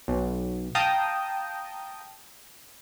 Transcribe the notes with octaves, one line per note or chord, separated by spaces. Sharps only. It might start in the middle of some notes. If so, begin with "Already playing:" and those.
B1
F5 G5 A5 A#5 D#6 G6